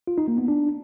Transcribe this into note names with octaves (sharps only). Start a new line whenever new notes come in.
F4
D#4
A#3
B3
D4